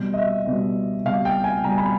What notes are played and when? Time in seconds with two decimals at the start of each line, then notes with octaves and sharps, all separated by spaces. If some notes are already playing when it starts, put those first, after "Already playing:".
Already playing: B2 G3
0.13 D#5
0.18 E5
0.47 B2 G3
1.05 B2 G3 F5
1.25 G5
1.44 G#5
1.64 B2 G3 A#5
1.78 B5